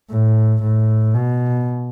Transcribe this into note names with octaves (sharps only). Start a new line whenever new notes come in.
A2
A2
B2